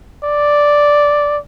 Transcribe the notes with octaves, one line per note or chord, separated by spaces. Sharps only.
D5